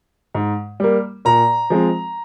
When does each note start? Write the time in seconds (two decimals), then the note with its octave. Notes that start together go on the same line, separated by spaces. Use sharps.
0.35 G#2
0.80 G3 A#3
1.25 A#2 A#5
1.70 F3 G#3 C4